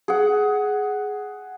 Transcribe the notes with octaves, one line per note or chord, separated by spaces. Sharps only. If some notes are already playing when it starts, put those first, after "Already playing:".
G#4 F#5